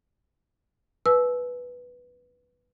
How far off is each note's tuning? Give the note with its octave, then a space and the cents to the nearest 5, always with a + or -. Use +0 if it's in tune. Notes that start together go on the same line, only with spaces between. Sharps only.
B4 -5 G#5 +45 E6 +0